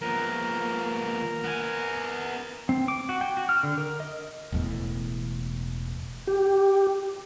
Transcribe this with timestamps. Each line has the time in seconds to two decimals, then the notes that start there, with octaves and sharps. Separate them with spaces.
0.01 F3 A#3 B3 A#4
1.44 B3 G#5
2.69 C4
2.88 D6
3.09 F#4
3.21 G5
3.37 F#4
3.49 F6
3.63 D3
3.78 A#4
4.00 D#5
4.52 E1 E2 A2
6.27 G4